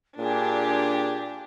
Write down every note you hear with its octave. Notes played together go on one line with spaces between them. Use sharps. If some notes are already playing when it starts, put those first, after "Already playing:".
A#2 D4 G4 G#4